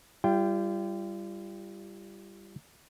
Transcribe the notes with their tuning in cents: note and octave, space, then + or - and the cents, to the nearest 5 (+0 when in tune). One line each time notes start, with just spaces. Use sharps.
G3 +0 F4 -40 G5 +0